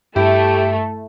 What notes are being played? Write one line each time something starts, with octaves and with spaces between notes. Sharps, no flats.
G2 A3 E4 G4